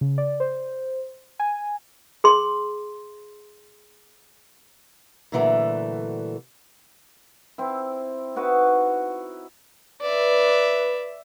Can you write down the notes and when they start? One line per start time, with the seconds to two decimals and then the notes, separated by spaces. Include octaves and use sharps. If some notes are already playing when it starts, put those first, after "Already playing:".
0.01 C#3
0.18 D5
0.40 C5
1.40 G#5
2.24 G#4 C6
5.32 A#2 D3 E3 F#3 G3 A3
7.58 C4 E4
8.36 D#4 E4 F#4 B4
10.01 B4 D5 E5